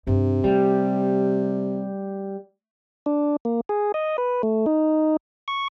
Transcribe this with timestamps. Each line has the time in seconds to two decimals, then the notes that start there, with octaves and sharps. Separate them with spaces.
0.07 G2 C3 D4
0.44 G3 A3
3.06 D4
3.45 A#3
3.69 G#4
3.94 D#5
4.18 B4
4.43 A3
4.66 D#4
5.48 C#6